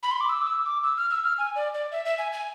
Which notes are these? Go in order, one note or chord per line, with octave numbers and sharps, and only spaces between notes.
B5
C6
D6
E6
D6
E6
D6
E6
F6
E6
F6
G#5
D5
D5
E5
E5
G#5
G#5